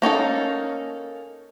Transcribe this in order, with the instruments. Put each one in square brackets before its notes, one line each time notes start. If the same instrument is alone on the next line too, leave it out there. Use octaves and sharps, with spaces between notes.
[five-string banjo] A#3 C#4 D#4 A4